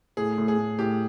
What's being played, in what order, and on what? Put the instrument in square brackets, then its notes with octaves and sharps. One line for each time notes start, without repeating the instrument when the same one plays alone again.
[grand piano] A2 [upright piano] G#4
[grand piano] A2
[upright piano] G#4
[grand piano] A2
[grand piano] A2 [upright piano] G4